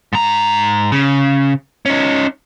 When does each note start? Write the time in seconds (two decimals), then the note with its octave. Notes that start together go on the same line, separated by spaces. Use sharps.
0.13 G#2 A#5
0.92 C#3
1.86 C#4 D#4